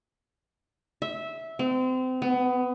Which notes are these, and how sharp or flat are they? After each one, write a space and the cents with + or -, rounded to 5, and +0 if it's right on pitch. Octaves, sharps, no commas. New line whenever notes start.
E5 -15
C4 -30
B3 +20